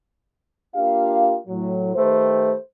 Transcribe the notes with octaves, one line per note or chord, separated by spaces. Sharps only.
A#3 D4 F4 G4 F5
A2 F#3
D#3 A3 G4 B4 C5